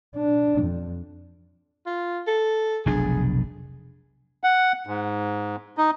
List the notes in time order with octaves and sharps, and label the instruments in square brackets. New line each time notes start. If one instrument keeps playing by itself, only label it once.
[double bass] D4
F2
[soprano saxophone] F4
A4
[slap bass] F1 B1 D4 [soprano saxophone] G#4
[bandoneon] F#5
G#2
D#4